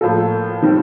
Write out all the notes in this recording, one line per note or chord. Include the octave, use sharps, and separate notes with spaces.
A2 F3 A#3 F4 A4
D#3 G3 C4